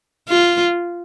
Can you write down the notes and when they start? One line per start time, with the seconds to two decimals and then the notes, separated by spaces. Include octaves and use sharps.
0.28 F4